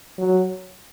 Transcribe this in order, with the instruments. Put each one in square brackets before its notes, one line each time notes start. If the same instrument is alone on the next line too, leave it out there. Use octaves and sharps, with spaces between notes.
[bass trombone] F#3